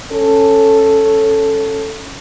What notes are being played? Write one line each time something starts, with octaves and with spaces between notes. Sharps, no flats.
C#4 A4